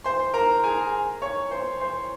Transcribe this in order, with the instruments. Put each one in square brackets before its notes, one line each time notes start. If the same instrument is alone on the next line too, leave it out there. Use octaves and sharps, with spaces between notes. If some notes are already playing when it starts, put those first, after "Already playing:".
[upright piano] C5 C6
A#4 A#5
G#4 G#5
C#5 C#6
C5 C6
C5 C6